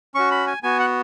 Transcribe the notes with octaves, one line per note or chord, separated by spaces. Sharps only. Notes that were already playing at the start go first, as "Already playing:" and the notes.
C#4 F#4 C#6
B5
G#5
B3 F#4 G#5
F#5